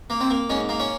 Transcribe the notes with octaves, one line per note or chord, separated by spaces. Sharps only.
A#3
C4
A#3
G#2 C#4
A#3
C#4